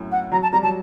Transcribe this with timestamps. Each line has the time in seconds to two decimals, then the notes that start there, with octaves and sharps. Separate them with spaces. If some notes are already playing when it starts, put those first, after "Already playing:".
Already playing: F#2 A2
0.11 F#5
0.32 F#3 A#5
0.42 A5
0.52 G3 A#5
0.63 F#3 A5